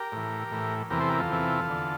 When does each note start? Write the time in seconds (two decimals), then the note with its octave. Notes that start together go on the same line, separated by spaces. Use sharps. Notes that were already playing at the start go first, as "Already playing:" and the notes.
Already playing: G4 A#4
0.12 A2 E3
0.51 A2 E3
0.90 E2 C3 E3 G4 A#4
1.00 A4 C5
1.09 G4 A#4
1.19 F4 A4
1.29 E2 C3 E3
1.69 E2 D3